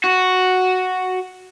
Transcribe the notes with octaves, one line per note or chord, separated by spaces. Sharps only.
F#4